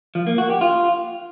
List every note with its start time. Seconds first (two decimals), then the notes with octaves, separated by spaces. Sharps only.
0.15 F3
0.27 A#3
0.38 F#4
0.50 G4
0.61 F4